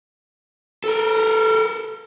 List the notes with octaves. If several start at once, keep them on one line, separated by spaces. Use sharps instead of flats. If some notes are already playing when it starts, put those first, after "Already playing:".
A4 A#4